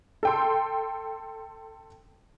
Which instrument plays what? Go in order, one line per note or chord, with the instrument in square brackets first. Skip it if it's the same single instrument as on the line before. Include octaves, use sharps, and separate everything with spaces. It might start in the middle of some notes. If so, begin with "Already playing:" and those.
[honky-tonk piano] A4 G5 C6